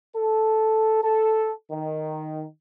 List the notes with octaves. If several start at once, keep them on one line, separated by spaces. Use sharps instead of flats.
A4
A4
D#3